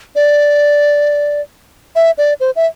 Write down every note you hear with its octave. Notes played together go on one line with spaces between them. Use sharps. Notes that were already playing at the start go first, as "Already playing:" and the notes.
D5
E5
D5
C5
E5